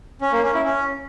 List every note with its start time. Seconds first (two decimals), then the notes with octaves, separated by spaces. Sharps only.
0.21 C#4
0.32 A#3
0.43 C#4
0.54 E4
0.65 C#4